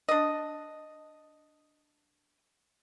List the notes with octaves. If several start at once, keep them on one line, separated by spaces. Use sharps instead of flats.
D4 D#5